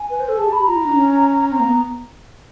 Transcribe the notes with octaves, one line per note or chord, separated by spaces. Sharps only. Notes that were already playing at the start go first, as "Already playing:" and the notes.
Already playing: G#5
B4
C5
A4
G#4 A5
G4
B5
F4 A#5
E4
D4
C#4
C4 A#5
A#3
B3